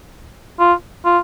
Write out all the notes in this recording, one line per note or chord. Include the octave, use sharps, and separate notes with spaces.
F4
F4